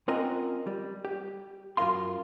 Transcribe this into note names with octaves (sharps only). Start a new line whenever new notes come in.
C4 C#4 F4 A#4 D#5 F#5
G3
G4
F#2 A#2 F4 A#4 F5 C6